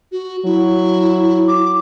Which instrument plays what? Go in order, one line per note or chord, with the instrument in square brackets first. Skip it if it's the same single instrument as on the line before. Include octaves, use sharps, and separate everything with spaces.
[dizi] F#4
[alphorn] F#3 [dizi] E4
[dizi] D6